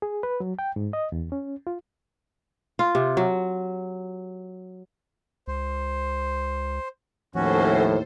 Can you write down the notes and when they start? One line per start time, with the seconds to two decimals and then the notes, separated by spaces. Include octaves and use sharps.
0.02 G#4
0.23 B4
0.40 F#3
0.59 G5
0.76 G#2
0.93 D#5
1.12 E2
1.32 C#4
1.67 F4
2.79 F4
2.95 C3
3.17 F#3
5.48 C#2 C5
7.35 D#2 A2 F3 C#4 F#4 A4 C5